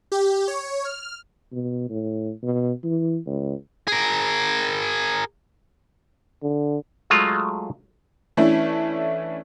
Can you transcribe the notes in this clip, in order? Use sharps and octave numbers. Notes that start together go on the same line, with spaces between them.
G4
C#5
F6
B2
A2
B2
E3
C#2
G#4 A#4
D3
F#3 G#3 A3 F4
E3 A3 C#4 D4 E4